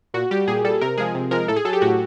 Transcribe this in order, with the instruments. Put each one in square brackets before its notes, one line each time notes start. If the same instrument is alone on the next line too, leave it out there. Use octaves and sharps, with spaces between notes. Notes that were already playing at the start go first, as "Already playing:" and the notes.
[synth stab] A#2 F#4
G3 G4
A#2 G#4
G3 A4
C3 A#4
F3 G#3 G#4
C3
F3 G#3 A#4
A2 A4
G#4
F#3 A4
G4
A2 F#4